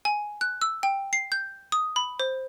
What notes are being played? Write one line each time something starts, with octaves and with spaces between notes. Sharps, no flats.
G#5
F#6
E6
G5
C7
G6
D#6
B5
C5